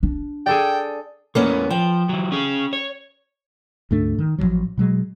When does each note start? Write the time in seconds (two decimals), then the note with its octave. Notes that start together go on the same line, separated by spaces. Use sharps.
0.03 D4
0.46 G#4 A4 D5 G5
1.35 E2 A2 C3 A#3 B3 C#4
1.70 F3 G5
2.09 E3 F#3
2.32 C#4 G#4
2.73 C#5
3.91 D2 G#2 A3 D4
4.19 D#3
4.38 A1 A#2 F3 F#3
4.78 B2 F#3 G#3